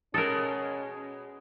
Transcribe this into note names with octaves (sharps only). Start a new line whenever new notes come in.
B2 G#3 C#4 A4 A#4 D#5